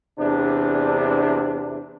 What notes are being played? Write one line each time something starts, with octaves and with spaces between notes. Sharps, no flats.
E2 C3 D4